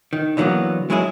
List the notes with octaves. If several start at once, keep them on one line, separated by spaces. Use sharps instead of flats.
D#3
D3 E3 F#3 A#3 B3
F#3 G#3 C#4 E4 F4 G#4